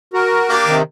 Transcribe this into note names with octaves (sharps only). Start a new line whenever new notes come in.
F#4 A#4
A#3 D4 G4
C3 D#3